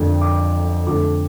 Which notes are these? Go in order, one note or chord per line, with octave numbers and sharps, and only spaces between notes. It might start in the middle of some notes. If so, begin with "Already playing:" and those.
Already playing: F2 D3 A3 D4 G5
D6
F2 D3 A3 D6